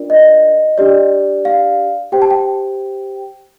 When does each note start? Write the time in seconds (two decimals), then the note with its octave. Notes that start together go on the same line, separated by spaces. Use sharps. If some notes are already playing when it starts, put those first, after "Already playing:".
Already playing: D4 F4 A#4 D5
0.10 D#5
0.78 D4 G4 D5
1.45 F5
2.12 G4 C5 G5
2.22 A5
2.30 G5